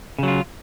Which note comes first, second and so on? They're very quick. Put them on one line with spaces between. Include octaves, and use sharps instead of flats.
C#3 F#3 F4